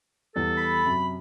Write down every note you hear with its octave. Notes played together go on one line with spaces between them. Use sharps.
E2 G3 A4
B5
F#2 C3